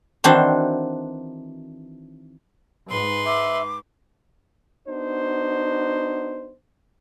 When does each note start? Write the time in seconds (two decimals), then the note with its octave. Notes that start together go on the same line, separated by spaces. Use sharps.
0.24 D#3 E3 C4 D4 F#4 C5
2.90 G#2 B4 C6
3.26 E5 D6
4.87 B3 D4 D#4 F#4 C5